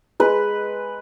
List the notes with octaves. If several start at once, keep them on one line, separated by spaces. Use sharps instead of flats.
G#3 B4